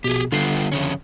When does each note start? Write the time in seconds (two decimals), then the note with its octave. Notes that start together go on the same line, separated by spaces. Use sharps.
0.04 A#1 B2 G4 G#4
0.32 D3 G3 B3 F4 C7
0.72 F2 C#3 C#4